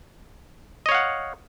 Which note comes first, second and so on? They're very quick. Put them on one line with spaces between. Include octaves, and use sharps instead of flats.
D#5 C#5 F5 F#5